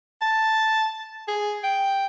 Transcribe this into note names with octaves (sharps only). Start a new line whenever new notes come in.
A5
G#4
G5